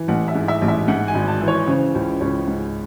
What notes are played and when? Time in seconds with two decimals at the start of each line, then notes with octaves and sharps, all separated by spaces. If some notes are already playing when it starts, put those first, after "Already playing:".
Already playing: E3
0.08 A1 F#5
0.28 E5
0.35 G#2
0.48 E5
0.62 A1
0.68 E5
0.88 G#2 F#5
1.08 G#5
1.15 G#1
1.28 A5
1.41 E3
1.48 C#5
1.67 C#3 C5
1.95 C#2
2.21 C#2 C#5
2.48 G#2